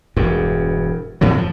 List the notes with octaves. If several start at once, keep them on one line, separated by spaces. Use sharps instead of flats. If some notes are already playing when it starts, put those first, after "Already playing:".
E1 E2 G2
F2 A2 C3 F#3
F3